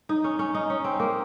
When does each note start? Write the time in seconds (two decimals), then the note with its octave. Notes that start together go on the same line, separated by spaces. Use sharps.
0.09 D#4
0.24 C#4
0.39 C#4
0.54 D#4
0.70 C#4
0.84 C4
1.00 A#3